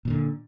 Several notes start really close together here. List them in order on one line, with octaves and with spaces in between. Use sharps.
A#2 E3 D3